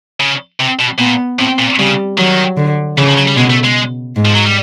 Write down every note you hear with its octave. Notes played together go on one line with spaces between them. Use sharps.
C#3
C3
B2
A#2 B3
A2 C4
A#2
C#3 G3
D#3 F#3
D3
C#3 E3
F3
F#3
G3
B2 G#3
A3
G#3
G#2
F3
F#3
G3